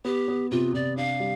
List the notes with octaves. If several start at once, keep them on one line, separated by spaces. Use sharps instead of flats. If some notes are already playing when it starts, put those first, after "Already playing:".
B3 G4
B3
C3 F4
C3 D5
D4 F5
G3